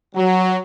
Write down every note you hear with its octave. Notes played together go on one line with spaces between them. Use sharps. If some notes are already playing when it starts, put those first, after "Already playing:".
F#3